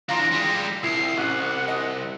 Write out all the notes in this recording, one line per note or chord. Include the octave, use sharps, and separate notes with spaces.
E3 D4 F4 A#5 C6 A#6
G3 G#3
C2 E4 C7
A1 F#5
D#5